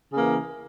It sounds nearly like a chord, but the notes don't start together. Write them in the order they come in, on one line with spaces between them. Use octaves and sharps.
C#3 A#3 E3